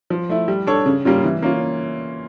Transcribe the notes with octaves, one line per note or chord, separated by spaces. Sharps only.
F3
A3 E4
G3
D4 A4 C#5
C#3
G3 A#3 C#4 F4
E3
A#3 C#4 F4